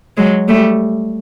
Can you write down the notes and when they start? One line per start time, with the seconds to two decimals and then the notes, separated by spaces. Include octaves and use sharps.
0.17 F#3 G#3
0.48 G3 A3